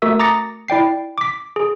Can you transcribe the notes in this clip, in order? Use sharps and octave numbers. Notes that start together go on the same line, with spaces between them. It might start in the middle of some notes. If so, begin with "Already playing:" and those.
A3 F#4 A#4 E5 E6
A#5 D6 D#6 A6 A#6 C#7
E4 D5 G5 C7
D6 B6
G#4